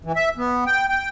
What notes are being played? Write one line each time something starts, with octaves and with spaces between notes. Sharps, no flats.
E3
E5
B3
G5
G5